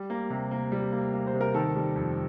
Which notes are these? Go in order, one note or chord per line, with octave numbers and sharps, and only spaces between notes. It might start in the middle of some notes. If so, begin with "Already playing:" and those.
Already playing: G3
A#3
C3
A#3
G3
A#3
A#3
C5
C3
A#4
D#3 A4
G3
F2